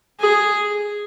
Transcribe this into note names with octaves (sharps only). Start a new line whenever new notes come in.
G#4